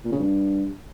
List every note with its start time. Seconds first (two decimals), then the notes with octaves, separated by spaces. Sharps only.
0.05 A#2
0.12 C#3
0.19 G2